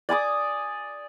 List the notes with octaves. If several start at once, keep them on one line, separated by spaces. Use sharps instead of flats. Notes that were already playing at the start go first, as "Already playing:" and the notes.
D5 G#5 D6 D#6